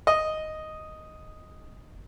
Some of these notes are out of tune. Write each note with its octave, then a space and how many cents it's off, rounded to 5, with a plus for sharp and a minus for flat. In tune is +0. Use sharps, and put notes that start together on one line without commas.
D#5 +0